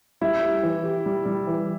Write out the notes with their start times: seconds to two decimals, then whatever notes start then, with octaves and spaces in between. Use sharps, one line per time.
0.21 G3 E4
0.43 G4
0.63 E3
0.84 G4
1.06 G3
1.25 G3
1.47 E3